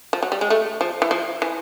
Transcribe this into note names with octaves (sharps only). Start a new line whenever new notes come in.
F3
F#3
G3
G#3
A3
F3
E3
F3
E3